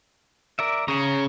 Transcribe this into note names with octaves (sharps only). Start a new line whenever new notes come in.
A#4 D5 E5
C#3 C#5 A#5